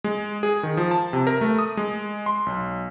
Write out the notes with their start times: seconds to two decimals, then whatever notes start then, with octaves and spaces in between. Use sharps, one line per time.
0.04 G#3
0.43 G#4
0.63 D#3
0.77 F3
0.91 A5
1.13 C3
1.27 A#4
1.41 A3
1.59 D#6
1.77 G#3
2.26 C6
2.46 B1